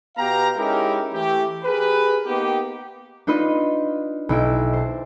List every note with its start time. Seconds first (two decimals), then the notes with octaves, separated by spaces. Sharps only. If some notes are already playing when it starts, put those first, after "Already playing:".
0.17 B2 B3 G4 F5 G5 A#5
0.57 G#3 C#4 D#4 E4 G4 A#4
1.13 E3 A3 G4
1.65 G4 G#4 A#4 B4
2.26 A#3 B3 D#4 G4
3.27 D4 D#4 F4 B4 D#5 C6
4.29 B1 E4 D7
4.73 C5 A5